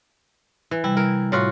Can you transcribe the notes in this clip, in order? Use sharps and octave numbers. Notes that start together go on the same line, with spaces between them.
E3
C3 G3 E4
E3 A#4
A2 F4 F#4